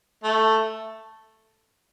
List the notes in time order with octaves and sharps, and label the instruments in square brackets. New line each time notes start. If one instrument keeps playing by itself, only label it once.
[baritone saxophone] A3